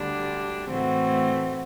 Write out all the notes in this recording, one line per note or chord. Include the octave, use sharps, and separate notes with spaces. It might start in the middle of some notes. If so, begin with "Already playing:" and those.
Already playing: D2 D3 G3 D4
A2 E3 A3 C4 F#4